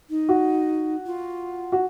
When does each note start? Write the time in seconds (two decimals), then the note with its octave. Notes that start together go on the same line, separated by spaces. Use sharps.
0.10 D#4
0.29 F#4
1.06 F4
1.72 F#4